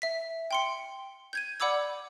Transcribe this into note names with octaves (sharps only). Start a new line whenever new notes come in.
E5 B6
G5 C6 C#7
G6 G#6 D#7
D5 F#5 B5 D6 E6 G#6